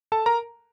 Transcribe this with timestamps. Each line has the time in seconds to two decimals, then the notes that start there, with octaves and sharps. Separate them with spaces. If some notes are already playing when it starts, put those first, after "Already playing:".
0.12 A4 A5
0.26 A#4 A#5